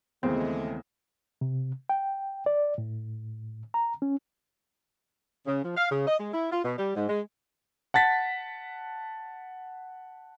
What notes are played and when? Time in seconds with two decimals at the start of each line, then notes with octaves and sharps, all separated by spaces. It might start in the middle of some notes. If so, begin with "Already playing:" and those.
0.23 D#2 C#3 E3 G#3 A3 B3 C4
1.41 C3
1.89 G5
2.46 D5
2.78 A2
3.74 A#5
4.02 C#4
5.46 C#3
5.64 F3
5.76 F5
5.91 C#3
6.07 D#5
6.20 G#3
6.34 E4
6.52 F4
6.64 B2
6.78 G3
6.95 G#2
7.08 G#3
7.94 F#5 A5 A6 B6